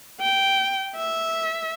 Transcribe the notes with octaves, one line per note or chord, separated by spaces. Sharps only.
G5
E5